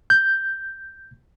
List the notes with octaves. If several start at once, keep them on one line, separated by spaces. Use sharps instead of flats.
G6